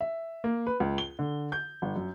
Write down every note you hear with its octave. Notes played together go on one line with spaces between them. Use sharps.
E5
A#3
B4
C#2
G7
D3
G6
G1
F#2